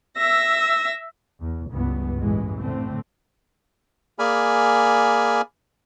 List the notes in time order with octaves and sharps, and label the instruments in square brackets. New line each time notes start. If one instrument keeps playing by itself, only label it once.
[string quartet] E5 E6 A#6
[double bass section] E2
C#2 G2 E3 B3
A1 F#2 E3 G#3
A2 D3 A3 C4
[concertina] A#3 G#4 D5 G#5 B5 F6